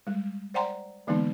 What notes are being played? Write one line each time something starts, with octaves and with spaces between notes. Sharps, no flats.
G3 G#3
C5 D5 F#5 G5 A#5 C6
D3 E3 G#3 A#3 B3 D#4